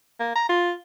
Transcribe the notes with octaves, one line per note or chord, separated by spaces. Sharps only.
A#3
A#5
F4